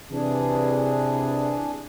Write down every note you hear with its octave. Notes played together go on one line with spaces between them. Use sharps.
C3 E3 D4 G#4